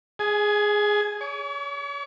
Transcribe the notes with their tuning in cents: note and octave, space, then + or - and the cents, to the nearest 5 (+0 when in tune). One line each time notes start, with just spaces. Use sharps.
G#4 +0 G#5 +30
C#5 +30 D6 -45